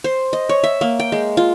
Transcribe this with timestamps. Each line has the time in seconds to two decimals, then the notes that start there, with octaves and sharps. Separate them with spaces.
0.04 C5
0.33 D#5
0.49 C#5
0.64 E5
0.81 A#3
1.00 G5
1.12 G#3
1.37 F4